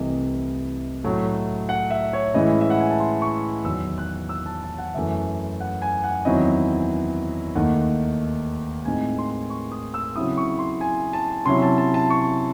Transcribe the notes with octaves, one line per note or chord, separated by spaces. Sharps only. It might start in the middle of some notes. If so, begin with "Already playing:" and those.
Already playing: C2 C3 E3 A3 D#5
A2 F#3 A3
F#5
E5
C#5
A2 E3 G#3 C#4 E4 D#5
E5
F#5
G#5
A5
C6
C#6
E2 D#3 F#3 E6
F#6
E6
A5
A5
F#5
F#2 E3 A3 E5
F#5
G#5
F#5
E2 D#3 F#3 C4 E4 D#5
D#2 D#3 A3 D#4 F#5
A2 G#3 C4 D#4 G#5
C6
C#6
D#6
E6
C#3 F#3 C4 E4 D#6
C#6
C6
G#5
A5
C3 F#3 C#4 E4 C6
A5
A5
A5
C#6